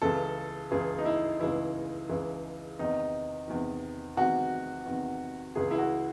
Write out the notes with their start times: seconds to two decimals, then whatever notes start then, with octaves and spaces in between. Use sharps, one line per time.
0.02 C#2 C#3 E3 A4
0.71 C#2 C#3 E3 G#4
0.98 D#4
1.05 E4
1.40 C#2 C#3 E3 E4
2.09 C#2 C#3 E3
2.79 E2 C3 D#3 D#4
3.48 E2 C3 D#3
4.17 E2 C3 D#3 F#4
4.86 E2 C3 D#3
5.55 C#2 C#3 E3 G#4
5.71 E4
5.78 F#4